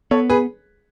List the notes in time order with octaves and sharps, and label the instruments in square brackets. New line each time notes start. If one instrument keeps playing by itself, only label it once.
[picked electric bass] B3 [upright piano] A4 C#5
[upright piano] G#4 B4